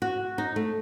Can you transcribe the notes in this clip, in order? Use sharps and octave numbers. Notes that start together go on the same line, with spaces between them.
F#4
D#4
A3